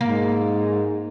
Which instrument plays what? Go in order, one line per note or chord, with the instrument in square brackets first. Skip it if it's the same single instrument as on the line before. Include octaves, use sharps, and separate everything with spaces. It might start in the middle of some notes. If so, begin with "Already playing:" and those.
[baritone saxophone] G#2 [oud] A#3